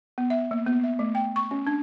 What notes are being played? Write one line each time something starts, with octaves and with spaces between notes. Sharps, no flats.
B3
E5
A#3
B3
E5
A3
G5
C#6
C#4
D4